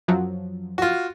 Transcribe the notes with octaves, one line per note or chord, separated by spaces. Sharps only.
F#2 F3 F#3
F4 F#4